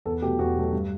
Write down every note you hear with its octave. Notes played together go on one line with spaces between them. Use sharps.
E2 A4
B2 F#3 A3 G4
E2 F#4
B2 F#3 A3
G2